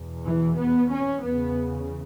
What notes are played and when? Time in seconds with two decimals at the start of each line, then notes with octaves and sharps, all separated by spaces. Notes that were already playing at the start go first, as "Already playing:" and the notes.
Already playing: E2 B2
0.25 E3
0.57 B3
0.91 C#4
1.23 E2 C#3 B3